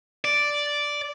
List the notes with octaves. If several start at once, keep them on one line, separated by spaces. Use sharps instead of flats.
D5